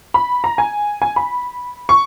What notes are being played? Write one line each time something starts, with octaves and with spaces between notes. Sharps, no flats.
B5
A#5
G#5
G#5
B5
C#6